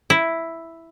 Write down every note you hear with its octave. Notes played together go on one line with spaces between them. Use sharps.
E4